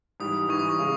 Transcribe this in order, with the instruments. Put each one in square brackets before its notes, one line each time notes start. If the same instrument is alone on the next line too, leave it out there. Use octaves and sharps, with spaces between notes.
[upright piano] G#2 E3 G3 [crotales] D#6
[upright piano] G#2 E3 G3 [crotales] C#6
[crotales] D#6
C#6
[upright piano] C#3 G#3